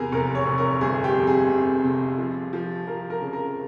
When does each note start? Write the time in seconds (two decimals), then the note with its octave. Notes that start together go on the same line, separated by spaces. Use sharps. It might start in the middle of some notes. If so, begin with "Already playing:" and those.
Already playing: E2 C3 G#4 A#4
0.12 F1 A#4
0.35 C#5
0.47 F1
0.58 A#4
0.81 G1 G#4
1.04 G4
1.15 F2
1.27 G#4
1.50 C3
1.84 C3
2.18 F3
2.53 F3
2.87 F3 A#4
3.10 A#4
3.22 C#3
3.33 A#4